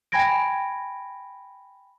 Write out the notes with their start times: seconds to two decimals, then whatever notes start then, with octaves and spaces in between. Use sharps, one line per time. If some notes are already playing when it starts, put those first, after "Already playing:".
0.12 G5 G#5 B5 G#6 A#6 D7